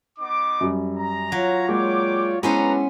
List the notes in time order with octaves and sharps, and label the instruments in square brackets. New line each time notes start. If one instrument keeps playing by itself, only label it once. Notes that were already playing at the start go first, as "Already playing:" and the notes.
[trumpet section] B3 D#4 D6
[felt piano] F#2 G3
[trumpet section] A#5
[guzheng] F#3 [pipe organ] F4 C#5
[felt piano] G#3 A#3 [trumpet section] D5 G5 D6
[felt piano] G#3 E4 [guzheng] B3 C#4 C5 [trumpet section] D4 B4 [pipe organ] A#5